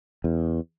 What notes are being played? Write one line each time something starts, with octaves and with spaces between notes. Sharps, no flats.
E2